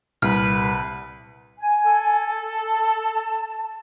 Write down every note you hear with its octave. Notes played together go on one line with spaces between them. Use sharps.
C2 A#2 G3 B4 F6
G#5
A4
A5